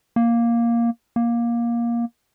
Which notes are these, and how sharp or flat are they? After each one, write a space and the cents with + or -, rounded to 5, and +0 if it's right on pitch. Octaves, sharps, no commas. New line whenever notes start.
A#3 +5
A#3 +15